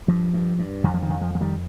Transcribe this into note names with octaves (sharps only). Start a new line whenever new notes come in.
G2 F3
G2
G2
F2 D#3
F3
D#3
F2
F3
F2 F3
D#3 G3